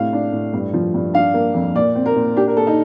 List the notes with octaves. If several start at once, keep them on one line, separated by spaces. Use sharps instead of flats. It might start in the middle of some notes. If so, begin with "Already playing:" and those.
Already playing: A2 C3 D4 F5
D4
A2
G2
F3
G2
D4 F5
A#3
F2
A#2 D5
C4
A#4
A#2
D4 G4
A#4
A#3 A4
D#4